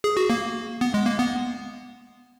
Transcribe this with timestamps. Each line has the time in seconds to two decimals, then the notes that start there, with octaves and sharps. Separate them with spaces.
0.04 G#4
0.17 F#4
0.30 A#3
0.81 B3
0.94 G#3
1.06 A#3
1.19 B3